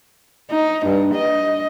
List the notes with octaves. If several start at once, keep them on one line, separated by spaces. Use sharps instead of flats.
D#4
G2
D#5